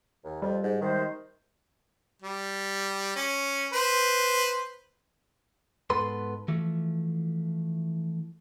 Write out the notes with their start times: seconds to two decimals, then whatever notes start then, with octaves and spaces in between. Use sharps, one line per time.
0.24 D#2
0.42 F2 G3
0.63 G#2
0.81 C3 D#3 G#3 C5
2.22 G3
3.15 C#4
3.73 B4 C5
5.90 G#2 B3 A4 B4 C6
6.48 E3 F3 A3